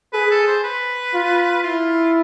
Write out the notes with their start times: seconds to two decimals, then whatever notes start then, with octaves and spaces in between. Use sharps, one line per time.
0.13 G#4 B4
0.31 A4
0.47 C5
0.64 B4
1.14 F4
1.63 E4 F4